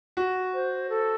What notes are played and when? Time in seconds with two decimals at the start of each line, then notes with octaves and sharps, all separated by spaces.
0.17 F#4
0.54 C5
0.90 A4